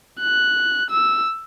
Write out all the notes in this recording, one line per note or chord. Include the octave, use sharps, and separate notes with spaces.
F#6
E6